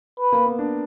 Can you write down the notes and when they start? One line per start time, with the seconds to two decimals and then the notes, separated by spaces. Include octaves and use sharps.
0.20 B4
0.32 A#3
0.46 B3
0.59 D4